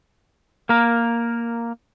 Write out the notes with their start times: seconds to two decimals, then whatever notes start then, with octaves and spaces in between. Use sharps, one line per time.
0.69 A#3 A#4